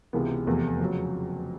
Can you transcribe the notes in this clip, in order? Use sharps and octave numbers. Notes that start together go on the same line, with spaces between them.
C#2 C3 E3 G#3 B3
F1 E2 C3 F3 A3
F2 C#3 F#3